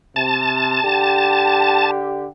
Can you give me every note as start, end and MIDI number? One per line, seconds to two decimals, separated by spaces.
0.16 0.78 48
0.16 1.91 81
0.83 2.25 50
0.83 2.25 67